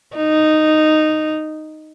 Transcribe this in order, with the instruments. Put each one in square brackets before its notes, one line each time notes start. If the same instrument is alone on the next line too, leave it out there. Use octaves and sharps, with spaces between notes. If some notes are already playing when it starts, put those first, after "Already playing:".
[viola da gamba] D#4